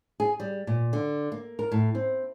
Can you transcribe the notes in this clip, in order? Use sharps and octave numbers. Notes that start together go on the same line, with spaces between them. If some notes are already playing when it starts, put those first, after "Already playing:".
G#4
G3
A#2
D3
A#3
A#4
A2
C4